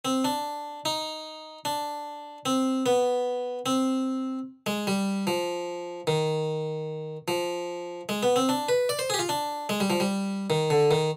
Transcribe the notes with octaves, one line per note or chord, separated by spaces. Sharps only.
C4
D4
D#4
D4
C4
B3
C4
G#3
G3
F3
D#3
F3
G#3
B3
C4
D4
B4
D5
C5
G#4
G4
F4
D4
G#3
G3
F3
G3
D#3
D3
D#3